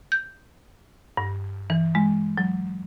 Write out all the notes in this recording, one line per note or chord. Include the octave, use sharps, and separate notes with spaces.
G6
G2
E3
G#3
F#3